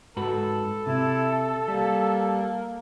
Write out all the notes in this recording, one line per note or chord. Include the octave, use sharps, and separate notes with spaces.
G#2 F#4 A4 B4
C3 E4
G3 A#3